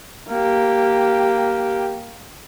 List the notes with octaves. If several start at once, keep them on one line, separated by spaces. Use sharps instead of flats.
A#3 G4